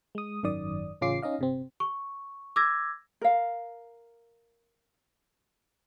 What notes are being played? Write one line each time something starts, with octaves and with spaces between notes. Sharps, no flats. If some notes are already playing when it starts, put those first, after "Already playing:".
G#3 D#6
G#1 F#2 D#3 D5 D#6
A1 C#3 C#4 F4 D6 C7
C#4 D#4 D#5 F5
G1 C3 C4
C#6
D6 E6 G#6 A#6
A#4 F5